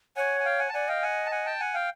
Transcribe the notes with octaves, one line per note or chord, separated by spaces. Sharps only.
C#5 F#5 G#5
G#5
F5 G5
F#5 G#5
A5
D5 F#5 G#5
D#5 F5 G5
F#5 G#5
A5
F#5 G#5
G5 A5
F#5 G#5
F5 G5